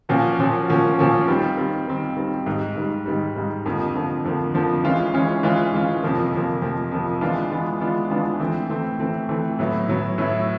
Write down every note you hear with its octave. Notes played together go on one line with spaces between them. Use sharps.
A#2 F3 A#3 C#4 F#4
A#2 F3 A#3 C#4 F#4
A#2 F3 A#3 C#4 F#4
A#2 F3 A#3 C#4 F#4
D#3 G3 C4
D#3 G3 C4
D#3 G3 C4
D#3 G3 C4
G#2 D#3 G3
G#2 D#3 G3
G#2 D#3 G3
G#2 D#3 G3
F2 D3 F3 A#3
F2 D3 F3 A#3
F2 D3 F3 A#3
F2 D3 F3 A#3
E3 G#3 C#4 F4
E3 G#3 C#4 F4
E3 G#3 C#4 F4
E3 G#3 C#4 F4
F2 C3 F3 A#3
F2 C3 F3 A#3
F2 C3 F3 A#3
F2 C3 F3 A#3
E3 G#3 B3 D4 F4
E3 G#3 B3 D4 F4
E3 G#3 B3 D4 F4
E3 G#3 B3 D4 F4
E3 A3 C4
E3 A3 C4
E3 A3 C4
E3 A3 C4
A2 F#3 B3 E4
A2 F#3 B3 E4
A2 F#3 B3 E4